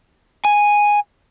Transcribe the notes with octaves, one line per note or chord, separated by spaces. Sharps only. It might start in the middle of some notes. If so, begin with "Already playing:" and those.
G#5